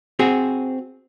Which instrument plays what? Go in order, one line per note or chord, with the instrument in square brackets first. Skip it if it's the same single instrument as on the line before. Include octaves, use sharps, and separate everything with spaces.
[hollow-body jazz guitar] C4 F#4 G#4